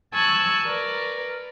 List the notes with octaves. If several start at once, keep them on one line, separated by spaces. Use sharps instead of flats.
G#5 A5 C#6 E6 F#6 G#6
A#4 B4 D5